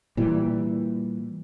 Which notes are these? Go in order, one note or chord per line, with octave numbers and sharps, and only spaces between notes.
A#2 E3 G3